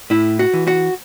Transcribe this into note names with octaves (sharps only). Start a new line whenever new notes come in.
A2 E4
F#4
E3
F#4